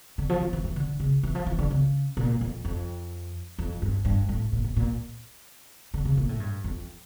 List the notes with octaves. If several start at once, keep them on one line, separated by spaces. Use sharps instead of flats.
D3
F3
F3
E3
E3
D3
C#3
E3
F3
E3
D3
C#3
A#2
F2
F2
F2
G2
G2
A2
A#2
A2
A#2
D3
C#3
A#2
A2
G2
F2